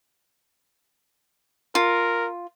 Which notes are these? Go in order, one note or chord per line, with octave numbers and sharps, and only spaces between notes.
F4 A#4